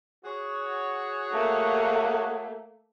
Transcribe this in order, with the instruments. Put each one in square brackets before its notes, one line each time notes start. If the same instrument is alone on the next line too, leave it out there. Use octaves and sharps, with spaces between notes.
[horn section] F#4 G#4 C#5
[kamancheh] A3 A#3